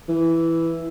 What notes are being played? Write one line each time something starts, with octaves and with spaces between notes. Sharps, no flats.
E3